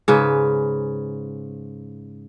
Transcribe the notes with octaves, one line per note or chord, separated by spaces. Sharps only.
G#2 C#3 B4